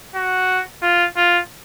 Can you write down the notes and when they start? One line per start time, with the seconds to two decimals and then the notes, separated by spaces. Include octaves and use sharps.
0.15 F#4
0.83 F4
1.17 F4